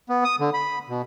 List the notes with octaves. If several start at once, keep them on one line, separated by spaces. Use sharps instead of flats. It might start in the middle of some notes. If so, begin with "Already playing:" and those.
B3
D#6
D3
B5
B2